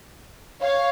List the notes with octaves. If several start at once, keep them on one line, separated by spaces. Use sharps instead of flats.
C#5 F5